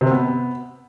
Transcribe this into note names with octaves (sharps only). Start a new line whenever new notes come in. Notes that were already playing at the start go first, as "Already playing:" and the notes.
C3
C4
B3